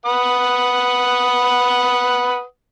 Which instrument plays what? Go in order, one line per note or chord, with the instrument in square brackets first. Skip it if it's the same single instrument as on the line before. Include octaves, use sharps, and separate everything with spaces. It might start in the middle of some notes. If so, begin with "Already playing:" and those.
[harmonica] B4 F#5 D#6